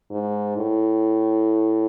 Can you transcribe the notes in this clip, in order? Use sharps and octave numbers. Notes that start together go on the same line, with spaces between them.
G#2
A2